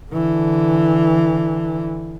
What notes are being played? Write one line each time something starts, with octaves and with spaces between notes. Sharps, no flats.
D3 E3